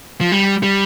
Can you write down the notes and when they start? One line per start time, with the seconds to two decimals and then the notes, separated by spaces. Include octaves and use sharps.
0.21 F3
0.32 G3
0.63 G3